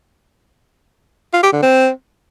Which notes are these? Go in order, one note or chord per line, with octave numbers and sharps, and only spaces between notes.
F4
G4
D3
C4